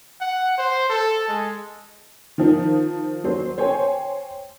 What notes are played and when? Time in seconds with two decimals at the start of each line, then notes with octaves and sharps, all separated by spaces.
0.21 F#5
0.58 C5
0.90 A4
1.28 G#3
2.38 D#3 F3
3.24 F#3 C5
3.58 C5 C#5 G5 G#5